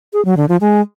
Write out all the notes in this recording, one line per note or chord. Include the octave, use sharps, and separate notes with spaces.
G#4
F#3
D3
F3
G#3